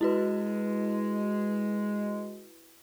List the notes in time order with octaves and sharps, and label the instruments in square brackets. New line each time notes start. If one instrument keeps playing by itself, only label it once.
[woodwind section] G#3 [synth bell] E4 F#4 B4